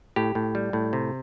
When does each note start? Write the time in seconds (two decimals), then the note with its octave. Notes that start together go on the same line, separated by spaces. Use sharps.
0.16 A2 G4
0.35 A2
0.55 G3
0.73 A2
0.93 C3